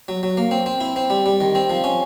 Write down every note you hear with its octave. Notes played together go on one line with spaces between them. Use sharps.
F#3
F#3
A#3
C4
C4
E4
C4
G3
G3
D#3
C4
F3
C#4